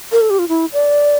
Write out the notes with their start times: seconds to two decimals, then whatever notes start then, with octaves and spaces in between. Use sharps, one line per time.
0.12 A#4
0.21 A4
0.30 G4
0.39 F4
0.48 E4
0.73 D5